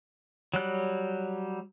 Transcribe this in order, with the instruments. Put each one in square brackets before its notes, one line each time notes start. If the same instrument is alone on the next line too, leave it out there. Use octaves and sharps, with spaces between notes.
[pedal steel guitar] F#3 G3 F#6